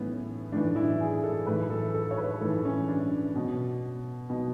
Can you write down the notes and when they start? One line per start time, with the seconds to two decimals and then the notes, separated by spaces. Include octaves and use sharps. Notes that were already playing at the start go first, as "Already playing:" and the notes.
Already playing: A2 E3 B3 C#4
0.52 A2 E3 D4
0.76 E4
1.01 G#4
1.24 A4
1.46 A2 E3 B4
1.70 A4
1.94 A4
2.11 C#5
2.18 B4
2.41 A2 E3 A4
2.65 C#4
2.88 D4
3.36 B2
4.30 B2